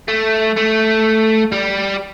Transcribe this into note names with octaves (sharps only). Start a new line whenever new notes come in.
A3
A3
G3